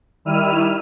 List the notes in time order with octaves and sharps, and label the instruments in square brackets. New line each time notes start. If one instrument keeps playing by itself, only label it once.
[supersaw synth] D#3 G3 E4 E6 F6 D#7